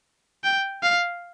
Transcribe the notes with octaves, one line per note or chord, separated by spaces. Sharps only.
G5
F5